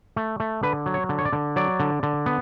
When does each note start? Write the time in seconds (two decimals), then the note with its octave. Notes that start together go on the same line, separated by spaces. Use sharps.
0.16 A3
0.40 A3
0.63 D3 B4
0.86 F#3
0.94 C#5
1.09 D3
1.19 C#5
1.25 D5
1.33 D3
1.56 F#3 D5
1.80 D3
2.03 D3
2.26 B3